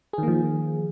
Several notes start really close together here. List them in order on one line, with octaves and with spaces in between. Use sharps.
G#4 D#3 A#3 F3